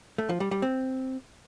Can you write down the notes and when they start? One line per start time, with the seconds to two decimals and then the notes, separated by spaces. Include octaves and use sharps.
0.18 A3
0.29 F3
0.40 G3
0.51 G3
0.62 C4